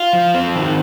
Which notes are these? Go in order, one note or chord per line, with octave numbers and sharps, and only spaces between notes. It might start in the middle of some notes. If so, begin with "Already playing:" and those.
Already playing: F4
F3
C4
D#3